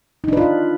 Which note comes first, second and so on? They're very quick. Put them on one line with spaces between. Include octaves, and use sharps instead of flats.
D#4 D4 B4 F4